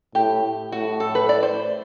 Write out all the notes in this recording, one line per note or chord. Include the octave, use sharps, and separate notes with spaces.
A2 G4
A2 F#4
A4
B4
D5
C5